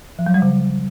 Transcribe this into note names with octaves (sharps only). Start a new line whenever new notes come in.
F3
F#3
G3
C#3